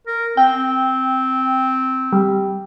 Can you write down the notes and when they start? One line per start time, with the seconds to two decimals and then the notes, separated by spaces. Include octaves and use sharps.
0.07 A#4
0.37 C4 G5
2.13 G3